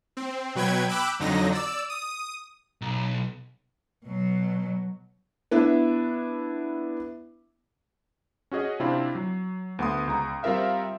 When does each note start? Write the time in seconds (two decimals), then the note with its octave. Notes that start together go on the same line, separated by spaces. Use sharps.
0.17 C4
0.55 B2 F#3 B4 G5 G#6
0.89 G5 B5 D6 E6 F#6
1.19 F2 D3 F#3 D#4 A#6
1.52 D5 E6
1.89 D#6
2.82 B1
4.06 B2 F#3
5.51 B3 D4 E4 E5
8.51 C#4 F#4 G#4 D#5
8.80 C3 C4 D4 E4 F4
9.15 F#3
9.79 D2 B3 F#5 C6 D#6
10.07 C#2 A#5
10.43 G3 C4 F4 A#4 E5 F5